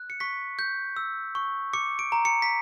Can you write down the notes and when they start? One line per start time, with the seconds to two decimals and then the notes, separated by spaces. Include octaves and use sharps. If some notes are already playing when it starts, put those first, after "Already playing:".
Already playing: F#6
0.10 C#7
0.20 C#6 B6
0.59 G6
0.96 E6
1.35 C#6
1.73 D6 C#7
1.99 D7
2.12 A#5
2.25 C#7
2.42 B6